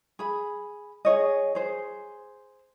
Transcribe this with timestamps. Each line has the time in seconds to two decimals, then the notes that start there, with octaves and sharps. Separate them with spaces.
0.19 G#4 B5
1.05 G#4 C#5 D#5
1.55 G#4 C5